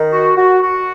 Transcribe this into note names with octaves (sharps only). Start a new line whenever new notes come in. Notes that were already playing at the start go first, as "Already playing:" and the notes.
Already playing: D#3
F#4
F#4
F#4